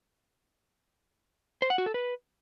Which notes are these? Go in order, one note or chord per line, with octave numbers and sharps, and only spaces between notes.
C5
F#5
F#4
A4
B4